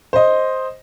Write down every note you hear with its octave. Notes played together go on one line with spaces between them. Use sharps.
C5 D#5